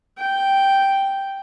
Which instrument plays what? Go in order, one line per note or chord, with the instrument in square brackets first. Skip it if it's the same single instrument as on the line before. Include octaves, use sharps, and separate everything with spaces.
[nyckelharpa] G5